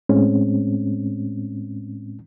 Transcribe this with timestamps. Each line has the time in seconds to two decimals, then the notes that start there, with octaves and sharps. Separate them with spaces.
0.09 A2 G#3 C4 C#4